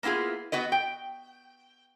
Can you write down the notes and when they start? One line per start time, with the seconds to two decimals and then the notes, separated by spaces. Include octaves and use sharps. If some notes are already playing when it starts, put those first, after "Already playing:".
0.03 A#3 B3 E4 F4 G#4
0.52 B3 F#4 B4 D#5
0.72 G5